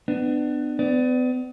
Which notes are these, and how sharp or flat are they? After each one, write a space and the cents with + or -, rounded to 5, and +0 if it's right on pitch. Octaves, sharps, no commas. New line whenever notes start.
B3 +25 D4 +25
B3 +40 D5 +0